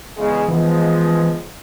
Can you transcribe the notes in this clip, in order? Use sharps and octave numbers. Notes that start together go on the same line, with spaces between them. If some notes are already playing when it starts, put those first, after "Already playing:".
E2 C#3 G#3
E3 F3 G#3 B3